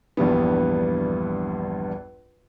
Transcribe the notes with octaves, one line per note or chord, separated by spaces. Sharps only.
A#1 E2 G2 G3 B3